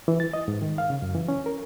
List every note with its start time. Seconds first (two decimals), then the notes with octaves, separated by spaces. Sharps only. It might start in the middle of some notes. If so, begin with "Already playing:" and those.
0.08 E3
0.20 A6
0.33 D#5
0.48 G#2
0.62 D#3
0.78 F5
0.90 C#3
1.02 F#2
1.15 E3
1.28 C#4
1.46 A#4